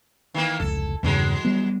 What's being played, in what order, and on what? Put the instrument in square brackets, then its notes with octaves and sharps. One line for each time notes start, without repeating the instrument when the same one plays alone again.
[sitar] D#3 E3 A#3
[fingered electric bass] F1 C#2 [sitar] A4
[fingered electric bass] E2 G2 C#3 [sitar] E3 F#3 G#3
[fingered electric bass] G3 B3